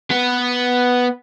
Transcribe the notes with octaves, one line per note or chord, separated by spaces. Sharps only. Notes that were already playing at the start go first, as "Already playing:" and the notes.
B3